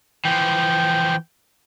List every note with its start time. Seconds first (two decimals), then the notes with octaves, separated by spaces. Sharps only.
0.25 E3 F3 G5